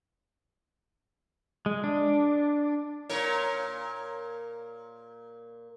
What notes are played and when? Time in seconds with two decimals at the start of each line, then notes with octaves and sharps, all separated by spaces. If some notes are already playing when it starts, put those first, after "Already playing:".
1.66 G#3
1.84 D4
3.09 A#2 A#4 C#5